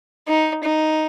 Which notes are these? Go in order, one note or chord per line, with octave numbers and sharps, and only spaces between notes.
D#4
D#4